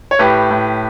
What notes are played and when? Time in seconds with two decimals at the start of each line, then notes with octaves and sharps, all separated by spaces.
0.11 C#5
0.19 A2 G4 B4
0.51 A2